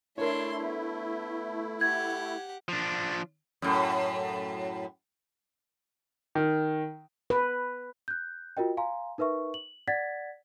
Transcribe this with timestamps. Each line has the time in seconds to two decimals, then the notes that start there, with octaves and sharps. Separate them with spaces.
0.18 A3 D4 E4 A#4 C#5 C6
0.60 B3
1.81 G4 F#5 G#6
2.68 F3 D4
3.62 F#2 A2
6.35 D#3
7.30 B4
8.08 F#6 G6
8.57 F4 F#4 A#4 D#5 G5
8.77 F5 G#5 A#5 C6
9.18 D#4 A#4 B4 E5 C#6
9.54 F#7
9.88 D5 F#5 G#6 A6 B6